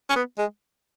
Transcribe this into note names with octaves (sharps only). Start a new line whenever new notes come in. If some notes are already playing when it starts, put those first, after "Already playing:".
C#4
B3
G#3